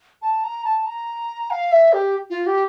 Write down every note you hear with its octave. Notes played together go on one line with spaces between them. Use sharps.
A5
A#5
A5
A#5
F5
E5
G4
F4
G4